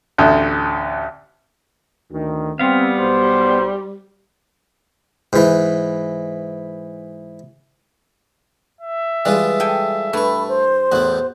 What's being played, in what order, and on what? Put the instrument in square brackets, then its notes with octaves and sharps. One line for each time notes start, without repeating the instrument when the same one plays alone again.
[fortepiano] A1 D2
[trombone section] D2 D#3
[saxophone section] G3 [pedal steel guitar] B3 F5 [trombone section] C4
[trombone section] B1 C5
[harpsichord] G#2 E3
[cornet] E5
[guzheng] E3 [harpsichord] G3 G#3 F4
[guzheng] A4 G5 G#5
[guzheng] G2 [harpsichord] A3 C#6 [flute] B5
[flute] C5
[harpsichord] E2 A2 E4 [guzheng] F#4